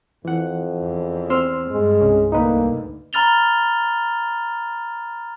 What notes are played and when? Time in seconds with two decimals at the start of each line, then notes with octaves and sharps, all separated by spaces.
0.25 F2 E3 F#5
0.78 E2
1.30 C4 C6 E6 F6
1.71 G2 G#3
2.01 C2 C#4
2.32 D2 A#3 D#4 B4
3.13 A#5 B5 F6 A6 F7 G7